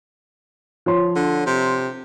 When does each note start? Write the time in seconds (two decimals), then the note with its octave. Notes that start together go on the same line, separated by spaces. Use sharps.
0.86 F3 C#5 C6
1.16 D3
1.46 C3